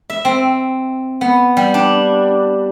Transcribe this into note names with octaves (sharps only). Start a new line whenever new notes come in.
E5
C4
B3
G3
D4